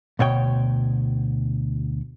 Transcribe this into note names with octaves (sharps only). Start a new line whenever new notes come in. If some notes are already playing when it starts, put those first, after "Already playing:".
D2 B2 C#5 G5